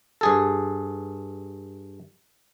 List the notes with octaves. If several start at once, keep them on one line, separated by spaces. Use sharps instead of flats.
G2 G#4 A4